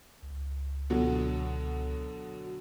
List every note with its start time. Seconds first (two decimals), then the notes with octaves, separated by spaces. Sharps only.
0.22 C#2
0.90 B2 D3 F#3